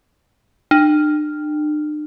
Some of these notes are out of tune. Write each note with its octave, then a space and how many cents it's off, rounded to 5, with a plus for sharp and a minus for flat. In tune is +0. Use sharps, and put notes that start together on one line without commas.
D4 +45